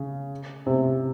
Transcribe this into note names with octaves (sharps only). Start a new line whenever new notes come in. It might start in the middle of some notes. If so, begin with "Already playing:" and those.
Already playing: C#3
C3